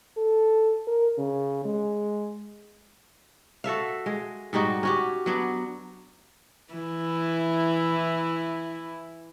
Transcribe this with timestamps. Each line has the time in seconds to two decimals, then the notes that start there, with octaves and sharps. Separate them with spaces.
0.17 A4
0.87 A#4
1.18 C#3
1.65 G#3
3.64 F#4 A4 E5 F5
4.06 G#3
4.53 G#2 G3 D#4 F#4
4.83 C#4 F#4 G4
5.26 F#3 B3 D4
6.73 E3 E4